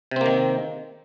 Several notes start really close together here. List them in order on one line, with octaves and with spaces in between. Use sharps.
C3 C4 A#3 D#3